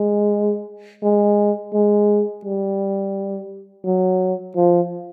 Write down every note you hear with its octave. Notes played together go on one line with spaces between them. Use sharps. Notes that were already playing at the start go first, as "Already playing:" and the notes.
Already playing: G#3
G#3
G#3
G3
F#3
F3